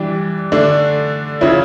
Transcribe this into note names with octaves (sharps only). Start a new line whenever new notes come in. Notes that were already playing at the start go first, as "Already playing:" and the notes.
Already playing: E3 G3 D4
D3 A3 D4
C#3 F3 C#4 E4